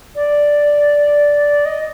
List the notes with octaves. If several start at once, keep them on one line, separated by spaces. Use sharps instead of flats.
D5
D#5